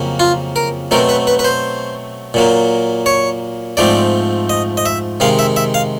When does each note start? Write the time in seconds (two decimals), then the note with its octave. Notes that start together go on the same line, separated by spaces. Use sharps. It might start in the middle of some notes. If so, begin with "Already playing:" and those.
Already playing: F2 C#3 F#3 A#3
0.20 F4
0.56 A#4
0.91 B2 F#3 A3 C4 A#4
1.09 B4
1.27 B4
1.39 B4
1.45 C5
2.34 A#2 F#3 A#3
3.06 C#5
3.77 G#2 F3 A3 C4 D5
4.49 D#5
4.77 D#5
4.86 E5
5.20 C3 D#3 G#3 F5
5.39 E5
5.56 E5
5.74 F5